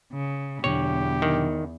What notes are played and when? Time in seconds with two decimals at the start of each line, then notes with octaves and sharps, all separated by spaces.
0.13 C#3
0.64 E2 B2 D3 F#3 G4 C#5
1.22 D#3